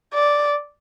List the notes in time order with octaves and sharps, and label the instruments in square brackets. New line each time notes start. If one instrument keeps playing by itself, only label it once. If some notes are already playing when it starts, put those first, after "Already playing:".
[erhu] D5